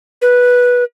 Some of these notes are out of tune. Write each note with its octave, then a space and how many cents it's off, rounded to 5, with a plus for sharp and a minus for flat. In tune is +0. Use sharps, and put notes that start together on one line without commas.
B4 -10